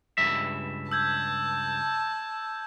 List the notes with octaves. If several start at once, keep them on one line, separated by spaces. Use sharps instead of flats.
C#2 G2 E5
A5 E6 G6 G#6